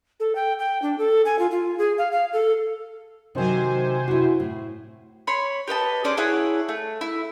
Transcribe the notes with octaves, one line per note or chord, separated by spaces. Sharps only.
A4
G5
G5
D4
A4
G#5
F4
F4
G#4
F5
F5
A4
C3 D#3 F#3 C5 G#5
E4 F#4
A2
C#5 B5 C6
G4 B4 D#5 A5
C#4 D4 G#4 C5
E4 G#4 C#5 F#5
A3
E4